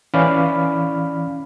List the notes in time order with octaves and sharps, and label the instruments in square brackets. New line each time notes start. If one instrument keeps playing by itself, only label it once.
[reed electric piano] E3 C#4 D5 F5 B5 F6